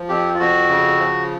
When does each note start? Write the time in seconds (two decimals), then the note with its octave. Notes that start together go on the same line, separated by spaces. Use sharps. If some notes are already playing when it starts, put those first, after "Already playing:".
Already playing: F3
0.09 F2 G4
0.34 F4
0.39 F2 F#4
0.69 C#3
0.99 F3